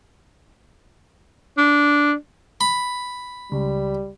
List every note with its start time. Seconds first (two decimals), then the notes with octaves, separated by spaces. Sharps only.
1.58 D4
2.61 B5
3.52 C#2 G3